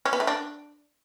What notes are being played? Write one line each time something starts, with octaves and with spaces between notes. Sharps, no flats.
C#4
B3
A3
D4